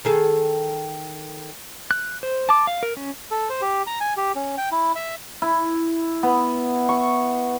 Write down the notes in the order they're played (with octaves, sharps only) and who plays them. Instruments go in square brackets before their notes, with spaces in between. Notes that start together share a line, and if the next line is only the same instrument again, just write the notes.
[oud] D#3 G#4 A4
[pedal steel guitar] F#6
C5
A5 D6
F5
A#4
C#4
[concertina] A4
C5
G4
A#5
G#5
G4
C#4
G5
E4
E5
[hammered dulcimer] E4
B3
C#6